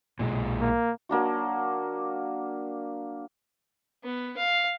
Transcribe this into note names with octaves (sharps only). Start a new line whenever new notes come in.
B1 A#2 G#3
A#3
F#3 A#3 D4 F#4
B3
F5